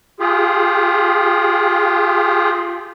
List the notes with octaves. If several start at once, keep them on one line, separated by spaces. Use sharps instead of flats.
F4 G4 G#4